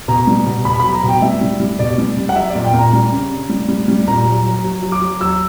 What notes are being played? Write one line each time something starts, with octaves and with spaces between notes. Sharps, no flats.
B2 A#5
G3
B2
B2 B5
F#3 B5
A#5
B2 G5
G3 E5
G3
G3
B2 D5
G3
G3
F#5
F#3 E5
A#2 D5
G5
A#2 A#5
G3
C#3
C#3
G3
G3
G3
A#2 A#5
F#3
F#3
F#3
F#3
D6
F#3
F#3 E6